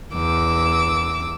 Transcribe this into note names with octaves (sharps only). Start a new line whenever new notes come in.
E2 D6 E6